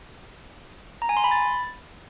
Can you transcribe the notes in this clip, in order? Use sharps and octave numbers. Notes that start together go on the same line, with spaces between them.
A#5
G#5
C6
B5
A6